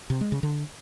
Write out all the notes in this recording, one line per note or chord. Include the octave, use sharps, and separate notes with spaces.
C3
G#3
C#3
D3